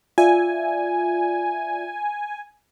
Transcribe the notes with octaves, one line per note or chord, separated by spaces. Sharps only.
F4 D5 E5 G#5